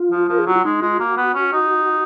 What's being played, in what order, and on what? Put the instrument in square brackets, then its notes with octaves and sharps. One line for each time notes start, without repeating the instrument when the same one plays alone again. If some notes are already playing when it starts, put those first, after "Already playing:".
Already playing: [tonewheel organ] F4
[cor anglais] F3
[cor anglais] F3 [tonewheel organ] A#4
[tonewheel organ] G#4
[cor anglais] F#3 [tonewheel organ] F#4
[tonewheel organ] F4
[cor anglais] G#3 [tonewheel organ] D#4
[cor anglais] G#3 [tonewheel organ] F4
[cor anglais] A#3 [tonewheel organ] F#4
[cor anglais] B3
C#4
D#4